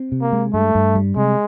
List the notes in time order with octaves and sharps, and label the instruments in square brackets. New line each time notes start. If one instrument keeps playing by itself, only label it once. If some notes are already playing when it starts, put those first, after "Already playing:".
Already playing: [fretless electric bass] C4
C3
[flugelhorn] A#3
[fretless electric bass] G#3
[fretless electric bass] G2 [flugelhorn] A3
[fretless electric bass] G2
G3
[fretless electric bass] C3 [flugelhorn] G#3